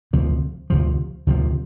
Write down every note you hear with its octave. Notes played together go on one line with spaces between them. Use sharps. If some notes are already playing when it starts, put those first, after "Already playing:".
D2 C3 F3
D2 C3 F3
D2 C3 F3